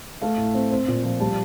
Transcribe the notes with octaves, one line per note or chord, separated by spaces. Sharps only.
A3 F5
A2
C4
C4
A#2
F3
G3 A5